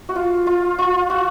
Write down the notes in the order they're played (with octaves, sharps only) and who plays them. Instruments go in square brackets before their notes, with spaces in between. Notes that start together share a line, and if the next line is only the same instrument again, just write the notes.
[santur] F#4
F4
F4
F4
F#4